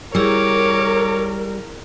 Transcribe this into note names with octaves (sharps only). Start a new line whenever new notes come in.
G3 E4 G#4 A#4 C#5 D6